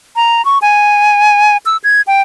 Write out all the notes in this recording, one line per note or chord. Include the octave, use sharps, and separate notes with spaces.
A#5
C#6
G#5
E6
G#6
G5